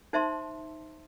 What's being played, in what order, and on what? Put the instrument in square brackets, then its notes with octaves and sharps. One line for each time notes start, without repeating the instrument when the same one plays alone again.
[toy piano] D#4 C5 E5 A5 C6